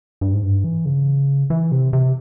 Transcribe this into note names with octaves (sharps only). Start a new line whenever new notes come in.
G2
G#2
G2
E3
C#3
E3
C3
C3